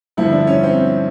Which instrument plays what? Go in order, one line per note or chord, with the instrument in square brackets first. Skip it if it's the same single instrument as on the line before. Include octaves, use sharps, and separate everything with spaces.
[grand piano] G2 D3 F3 E4
D4
C#4
C4